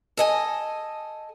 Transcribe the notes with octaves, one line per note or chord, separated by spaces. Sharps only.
A4 D#5 G#5